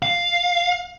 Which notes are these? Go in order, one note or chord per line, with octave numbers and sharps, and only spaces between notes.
F5